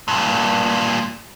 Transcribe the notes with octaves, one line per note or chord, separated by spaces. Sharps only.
G2 A#2